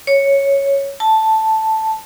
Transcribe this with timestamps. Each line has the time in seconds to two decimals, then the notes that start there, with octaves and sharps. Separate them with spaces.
0.07 C#5
1.00 A5